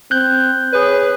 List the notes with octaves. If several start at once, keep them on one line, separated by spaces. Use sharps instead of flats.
C4 F#6 G6
G#4 B4 C#5